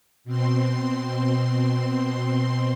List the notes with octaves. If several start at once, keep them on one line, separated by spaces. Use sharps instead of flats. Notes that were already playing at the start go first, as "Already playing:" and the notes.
B2 C4 C6